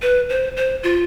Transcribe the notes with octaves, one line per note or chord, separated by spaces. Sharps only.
B4
C5
C5
F4